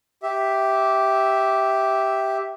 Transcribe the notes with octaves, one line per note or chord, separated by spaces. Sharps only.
G4 E5